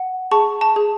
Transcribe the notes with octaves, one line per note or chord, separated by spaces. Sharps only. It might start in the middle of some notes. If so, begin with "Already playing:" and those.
Already playing: F#5
G#4 A5 C#6
A5
G#4